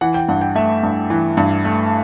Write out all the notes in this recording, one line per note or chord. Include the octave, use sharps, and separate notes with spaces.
E3 F#5
G5
G2 F#5
G5
A3 E5
G2
E3
G2
A3